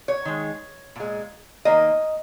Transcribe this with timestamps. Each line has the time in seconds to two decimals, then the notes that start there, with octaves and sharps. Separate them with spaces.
0.08 C#5
0.25 D#3 G#3
0.96 A#2 G#3
1.65 D#3 A#3 D#5